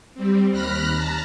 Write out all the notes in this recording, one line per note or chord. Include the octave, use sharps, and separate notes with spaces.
G3 C4
D#2 B5 F6 F#6 A#6
A5 A#5